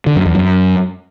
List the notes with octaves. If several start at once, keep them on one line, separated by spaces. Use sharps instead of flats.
D3
F#2
E2
F#2